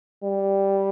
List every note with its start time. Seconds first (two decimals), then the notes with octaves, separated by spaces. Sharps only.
0.24 G3